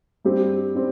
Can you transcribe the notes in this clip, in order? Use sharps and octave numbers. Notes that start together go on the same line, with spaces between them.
G2 G3 C4 G4
G3 C4